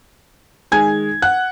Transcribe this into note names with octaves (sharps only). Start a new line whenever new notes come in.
D#3 G#3 G#5 G#6
F#5 F#6